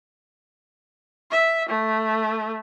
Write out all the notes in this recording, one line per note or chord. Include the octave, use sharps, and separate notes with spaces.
E5
A3